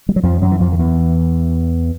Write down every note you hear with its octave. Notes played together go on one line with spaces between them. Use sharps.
G3
F#3
F2 F3
F#2 F#3
E3
F2 F3
D#3
E2 E3